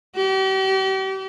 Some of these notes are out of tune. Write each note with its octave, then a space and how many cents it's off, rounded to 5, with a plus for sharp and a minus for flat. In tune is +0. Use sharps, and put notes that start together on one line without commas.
G4 -40